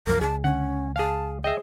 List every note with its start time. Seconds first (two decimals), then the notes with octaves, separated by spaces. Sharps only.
0.07 C2 F#2 F3 A#4
0.21 C#2 G#4 A5
0.44 D3 C#4 F#5
0.96 G#4 F5 A5
1.44 G#4 D#5 E5 G5 A#6 C7